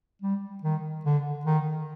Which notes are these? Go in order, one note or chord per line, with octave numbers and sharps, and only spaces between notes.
G3
D#3
D3
D#3